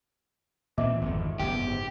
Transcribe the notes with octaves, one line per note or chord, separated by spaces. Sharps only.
A#2 E3 C4 D#5 E5 D6
G#1 F2 D3
F#1 G#2 B3 G4